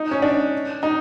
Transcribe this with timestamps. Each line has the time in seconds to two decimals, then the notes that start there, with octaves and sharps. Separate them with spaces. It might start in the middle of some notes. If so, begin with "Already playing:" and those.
Already playing: D#4
0.11 C#4
0.22 D4
0.83 D#4